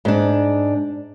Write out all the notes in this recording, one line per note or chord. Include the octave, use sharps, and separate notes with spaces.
G#2 D4